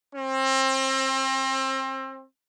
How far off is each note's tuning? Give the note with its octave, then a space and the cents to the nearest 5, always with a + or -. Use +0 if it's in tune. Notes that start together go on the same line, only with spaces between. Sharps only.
C4 +30